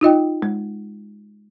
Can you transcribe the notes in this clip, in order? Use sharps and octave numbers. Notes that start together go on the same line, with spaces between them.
D#4 F4 D#5 G5
G#3